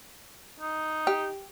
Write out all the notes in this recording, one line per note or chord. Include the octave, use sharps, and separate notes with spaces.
D#4
G4